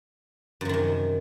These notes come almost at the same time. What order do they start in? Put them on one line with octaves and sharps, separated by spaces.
F#2 F3 D#3 C3